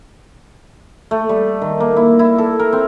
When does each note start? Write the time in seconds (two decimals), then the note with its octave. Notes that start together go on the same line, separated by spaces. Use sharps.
1.11 A3
1.29 G3
1.62 D#3
1.80 A#3
1.96 E4
2.19 E4
2.38 A4
2.59 A#4
2.73 C4